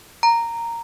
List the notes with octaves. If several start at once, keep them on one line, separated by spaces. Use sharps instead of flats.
A#5